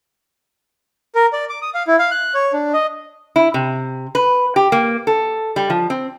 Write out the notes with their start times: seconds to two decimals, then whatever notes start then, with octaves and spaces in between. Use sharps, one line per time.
1.15 A#4
1.33 D5
1.49 D6
1.62 D#6
1.75 F5
1.87 E4
1.99 F5
2.11 F#6
2.35 C#5
2.53 D4
2.73 D#5
3.36 E4
3.54 C3
4.15 B4
4.56 G4
4.72 A#3
5.07 A4
5.56 G3
5.70 F3
5.90 C4